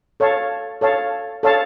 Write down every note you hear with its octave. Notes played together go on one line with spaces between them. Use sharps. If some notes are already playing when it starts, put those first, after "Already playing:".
A4 C#5 F5 A5
A4 C#5 F5 A5
A4 C#5 F5 A5